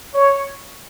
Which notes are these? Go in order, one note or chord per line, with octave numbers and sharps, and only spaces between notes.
C#5